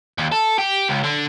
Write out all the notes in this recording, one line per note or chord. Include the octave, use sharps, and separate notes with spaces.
D#2
A4
G4
C#2
D3